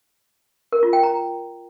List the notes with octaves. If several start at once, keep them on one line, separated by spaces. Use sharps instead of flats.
A#4
F4
G5
A#5